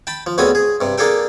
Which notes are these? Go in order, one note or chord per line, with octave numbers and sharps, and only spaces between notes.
G5 A5 B5
F3
D2 C#3 B3 C4 G#5 D#6
G#4
G2 C3
A#3 D4 G#4 A4 G5